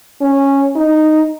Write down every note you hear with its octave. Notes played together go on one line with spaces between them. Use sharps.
C#4
D#4